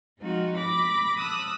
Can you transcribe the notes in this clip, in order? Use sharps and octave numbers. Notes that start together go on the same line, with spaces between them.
F3 G#3 C4 D#4 F4 F#4
B5 D6 A#6
A5 D#6 E6 F#6